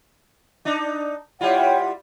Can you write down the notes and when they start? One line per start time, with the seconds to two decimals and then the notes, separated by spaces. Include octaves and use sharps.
0.65 D4 D#4
1.41 G3 E4 F4 C#5 E5 F#5 G5